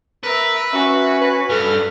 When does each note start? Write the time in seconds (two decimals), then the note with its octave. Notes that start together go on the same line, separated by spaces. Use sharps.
0.23 A#4 B4 E5
0.73 C#4 F#4 E5
1.21 B4
1.50 G2 A4 B4 F6